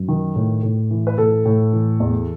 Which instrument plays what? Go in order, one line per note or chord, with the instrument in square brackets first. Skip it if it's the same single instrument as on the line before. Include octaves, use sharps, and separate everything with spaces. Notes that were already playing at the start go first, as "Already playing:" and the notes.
Already playing: [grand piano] F#2
D#3
A2
A2
E3
B4
A2 A4
A2
E3
E2